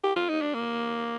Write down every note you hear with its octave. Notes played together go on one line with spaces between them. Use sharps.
G4
F4
D#4
D4
A#3